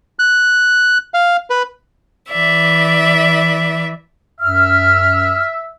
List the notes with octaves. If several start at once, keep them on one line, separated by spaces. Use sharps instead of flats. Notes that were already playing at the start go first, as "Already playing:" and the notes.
F#6
F5
B4
E3 D5 E5
F#2 E5 F6